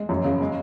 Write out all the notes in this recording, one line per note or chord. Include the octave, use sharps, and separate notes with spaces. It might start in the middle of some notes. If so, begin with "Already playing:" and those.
Already playing: G#3
F#2
C#3
G#3